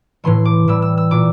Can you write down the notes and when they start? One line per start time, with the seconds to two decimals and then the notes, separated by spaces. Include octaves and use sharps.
0.24 A2 E3 A3 C6
0.45 D6
0.67 A2 E3 G3 E6
0.82 E6
0.97 E6
1.11 A#2 A3 D6